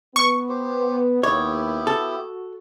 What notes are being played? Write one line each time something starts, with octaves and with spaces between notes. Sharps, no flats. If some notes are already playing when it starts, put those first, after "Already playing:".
B3 C#6
G4 C5
D#2 B3 E4 G4 C#5
F#4 A4